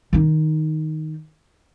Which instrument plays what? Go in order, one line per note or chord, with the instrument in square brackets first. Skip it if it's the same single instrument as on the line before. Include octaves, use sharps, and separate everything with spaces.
[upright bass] D#3 D#4